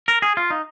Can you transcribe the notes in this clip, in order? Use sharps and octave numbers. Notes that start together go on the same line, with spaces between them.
A#4
G#4
F4
D#4